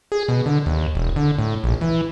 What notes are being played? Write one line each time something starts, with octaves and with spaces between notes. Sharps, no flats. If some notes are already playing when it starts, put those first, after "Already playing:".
G#4
B2
D3
D#2
E1
D3
A2
A#1
E3